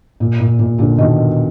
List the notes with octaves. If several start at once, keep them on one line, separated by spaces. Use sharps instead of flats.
A#2
A#2
A#2
A#2 D3
B2 D#3